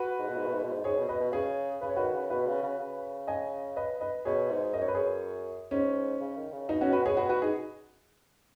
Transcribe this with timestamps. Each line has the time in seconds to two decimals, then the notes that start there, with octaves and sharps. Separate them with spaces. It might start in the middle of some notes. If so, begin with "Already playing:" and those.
Already playing: F#4 B4
0.19 G#2
0.28 B2
0.37 G#2
0.46 B2
0.54 G#2
0.63 B2
0.71 G#2
0.84 G#2 G#4 C#5
0.97 B2
1.09 B2 B4 D#5
1.20 B2
1.33 C#3 G#4 C#5
1.81 C#3 B4
1.89 C#5
1.96 D#3 F#4 B4
2.14 C#3
2.30 B2 F#4 B4
2.47 C#3
2.63 C#3
2.79 C#3
3.27 D#5 G#5
3.76 B4 D#5
4.01 B4 D#5
4.25 B2 G#4 C#5
4.50 G#2
4.73 F#2 D#5
4.82 C#5
4.88 B4
4.95 G#4 C#5
5.71 G#2 C#4
6.21 C#3
6.37 D#3
6.52 C#3
6.69 B2 D#4
6.81 C#4 F#4
6.93 F#4 B4
7.05 G#4 C#5
7.17 F#4 B4
7.29 F#4 B4
7.42 D#4 G#4